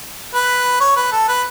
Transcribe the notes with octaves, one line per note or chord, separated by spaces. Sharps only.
B4
C#5
B4
A4
B4